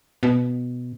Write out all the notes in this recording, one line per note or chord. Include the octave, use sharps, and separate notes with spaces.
B2